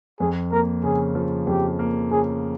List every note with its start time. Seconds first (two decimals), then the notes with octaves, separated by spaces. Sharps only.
0.20 F2 G#4
0.52 A#3 A#4
0.83 C#3 G#4
1.15 F3
1.47 F2 G4
1.79 A#3
2.11 C#3 G#4